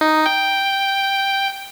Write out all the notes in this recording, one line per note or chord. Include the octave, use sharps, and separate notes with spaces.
D#4
G5